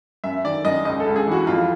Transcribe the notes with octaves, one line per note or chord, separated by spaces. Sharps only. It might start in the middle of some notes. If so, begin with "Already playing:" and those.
F#2 E5
D#3 D5
F#2 D#5
C#2 D#5
A4
C#2
G#4
E3 F#4
F2 F4